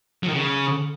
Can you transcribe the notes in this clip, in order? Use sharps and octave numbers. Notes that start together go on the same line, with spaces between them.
F#3
D#3
C#3